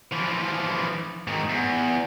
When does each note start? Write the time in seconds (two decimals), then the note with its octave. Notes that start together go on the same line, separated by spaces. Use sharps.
0.12 E3 F3
1.28 G#2 D#3
1.50 E2